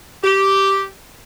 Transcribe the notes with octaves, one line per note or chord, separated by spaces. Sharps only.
G4